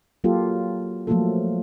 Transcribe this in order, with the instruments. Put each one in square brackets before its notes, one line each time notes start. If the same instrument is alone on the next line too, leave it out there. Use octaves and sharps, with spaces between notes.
[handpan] F#3 A#3 F4 G4 A4
F3 F#3 A3 A#3 F4 A4